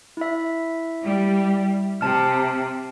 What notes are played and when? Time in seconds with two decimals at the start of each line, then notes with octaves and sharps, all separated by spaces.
0.17 E4 E5
1.04 G3
2.01 C3 A5 F6